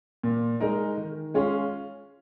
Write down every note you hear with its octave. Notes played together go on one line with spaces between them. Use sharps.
A#2
G#3 D#4 A#4
D#3
G#3 C#4 F4 G#4